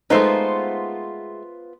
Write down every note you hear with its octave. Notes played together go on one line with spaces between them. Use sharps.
G#3 A3 B3 D#4 F4 C5